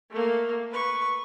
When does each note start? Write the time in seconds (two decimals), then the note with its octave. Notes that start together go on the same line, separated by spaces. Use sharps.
0.11 A3 A#3
0.71 B4 C#6